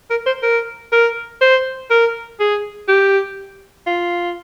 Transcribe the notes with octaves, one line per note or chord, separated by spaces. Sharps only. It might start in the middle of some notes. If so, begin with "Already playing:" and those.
A#4
C5
A#4
A#4
C5
A#4
G#4
G4
F4